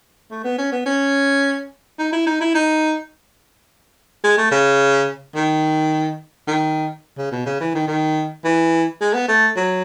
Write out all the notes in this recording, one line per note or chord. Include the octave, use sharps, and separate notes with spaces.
A3
B3
C#4
B3
C#4
D#4
E4
D#4
E4
D#4
G#3
A3
C#3
D#3
D#3
C#3
B2
C#3
E3
D#3
D#3
E3
G#3
B3
A3
F#3